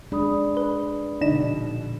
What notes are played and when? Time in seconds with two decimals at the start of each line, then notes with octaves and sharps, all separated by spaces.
0.12 G#3 D4 G#4 D5 B5 D#6
0.57 B4
1.21 A#1 B2 D3 D4 D#4 E7